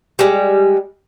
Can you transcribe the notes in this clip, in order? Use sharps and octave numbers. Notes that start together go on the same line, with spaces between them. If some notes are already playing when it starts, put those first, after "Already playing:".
G3 G#3